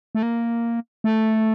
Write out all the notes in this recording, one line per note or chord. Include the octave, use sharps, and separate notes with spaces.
A3
A#3
A3